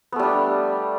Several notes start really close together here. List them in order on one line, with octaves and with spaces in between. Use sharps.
B3 A3 G3 D4